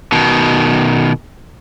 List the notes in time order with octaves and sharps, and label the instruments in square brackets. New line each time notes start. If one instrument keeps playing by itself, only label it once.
[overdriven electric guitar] B2 D#3